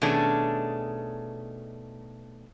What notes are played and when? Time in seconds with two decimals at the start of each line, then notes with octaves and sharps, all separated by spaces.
0.02 B2 D#3 A3 C#4 D4 G#4